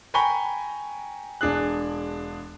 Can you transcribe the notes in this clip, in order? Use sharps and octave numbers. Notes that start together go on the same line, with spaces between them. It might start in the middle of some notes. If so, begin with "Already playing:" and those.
G5 G#5 A#5 B5 C#6 G7
E1 D4 G#4 F#6